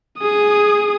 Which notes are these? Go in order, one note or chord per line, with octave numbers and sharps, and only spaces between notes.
G#4 D#6